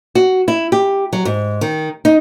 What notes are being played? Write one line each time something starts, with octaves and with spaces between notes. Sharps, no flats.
F#4
E4
G4
F#3
G#2
D#3
D#4